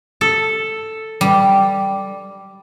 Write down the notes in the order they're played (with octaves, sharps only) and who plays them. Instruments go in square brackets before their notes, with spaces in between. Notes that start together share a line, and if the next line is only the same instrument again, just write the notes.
[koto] A4
[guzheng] G3